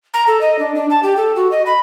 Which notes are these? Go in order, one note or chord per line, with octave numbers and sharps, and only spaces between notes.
A#5
A4
D#5
D4
D4
A5
G4
A4
F#4
D#5
B5